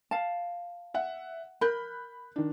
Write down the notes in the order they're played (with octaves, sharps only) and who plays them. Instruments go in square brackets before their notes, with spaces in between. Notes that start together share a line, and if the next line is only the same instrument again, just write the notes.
[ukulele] F5 A5
[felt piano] E5 F#5
[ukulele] A#4 [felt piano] B5 F#6 G6
[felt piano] D#3 D4